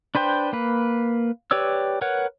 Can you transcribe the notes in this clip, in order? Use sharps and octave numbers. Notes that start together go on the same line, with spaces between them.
D4 B4 C5 G5
A#3 B4
G4 B4 C#5 D5 E6
A#4 B4 C#5 F#5